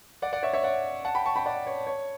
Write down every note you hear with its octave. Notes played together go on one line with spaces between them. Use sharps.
D5 F#5
D5 F#5
C#5 E5
C#5 E5
D5 F#5
F#5 A5
G5 B5
A5 C#6
G5 B5
D5 F#5
C#5
C#5